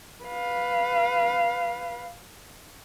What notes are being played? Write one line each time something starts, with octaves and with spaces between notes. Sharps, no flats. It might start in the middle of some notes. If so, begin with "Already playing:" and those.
B4 F5